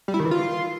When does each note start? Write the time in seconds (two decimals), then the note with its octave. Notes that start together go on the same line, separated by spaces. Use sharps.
0.08 G3
0.14 E4
0.20 D#3
0.25 E3
0.31 F4